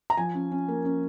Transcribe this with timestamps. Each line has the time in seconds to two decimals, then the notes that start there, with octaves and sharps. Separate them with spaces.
0.10 A#5
0.17 F3 G#5
0.34 C#4
0.52 C#4
0.68 A#3
0.85 C#4